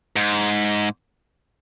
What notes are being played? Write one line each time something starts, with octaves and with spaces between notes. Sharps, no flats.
G#2